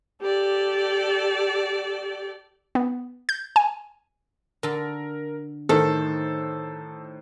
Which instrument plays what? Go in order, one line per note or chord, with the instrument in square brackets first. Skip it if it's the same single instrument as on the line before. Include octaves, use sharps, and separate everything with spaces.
[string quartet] G4 A4 D5
[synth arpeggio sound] B3
G6
G#5
[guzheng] D3 A4 [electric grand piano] A#4
[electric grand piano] A2 D#4 C5 [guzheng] D#3 [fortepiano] A4